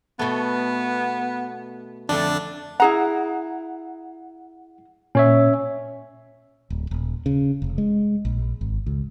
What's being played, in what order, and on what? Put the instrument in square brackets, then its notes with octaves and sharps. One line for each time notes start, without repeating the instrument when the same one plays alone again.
[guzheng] B2 A3 [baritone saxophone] B3
[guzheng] F2 D3 E5 [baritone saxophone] A3 [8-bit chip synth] D4
[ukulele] E4 G#4 A#5 [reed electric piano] F#5
[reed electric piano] A#2 [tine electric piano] C#4 C#5 E5
[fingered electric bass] D1
D#1
C#3
F1
G#3
A#1
G#1
C#2